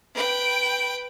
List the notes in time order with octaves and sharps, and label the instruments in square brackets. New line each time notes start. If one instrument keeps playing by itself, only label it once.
[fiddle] B4 G5